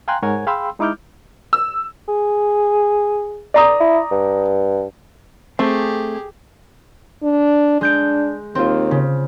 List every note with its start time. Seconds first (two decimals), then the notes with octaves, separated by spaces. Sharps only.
0.08 F5 G5 G#5 A#5 C6 F#6
0.22 G#2 A#4 C#5 F#5 G#5 G#6
0.47 G#4 F5 G5 B5 C6 E6
0.79 G#3 D#4 E4 D6 F6 G6
1.53 E6
2.08 G#4
3.54 D5 A#5 D#6
3.80 E4
4.11 G2
5.59 A3 C4 G4 G#4
7.23 D4
7.81 G#3 D4 G6 D7
8.55 D#2 C4 F4
8.91 C#3